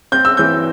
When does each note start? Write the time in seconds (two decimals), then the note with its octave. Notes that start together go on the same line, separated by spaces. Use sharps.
0.12 C4 G6
0.25 E6
0.37 E3 G6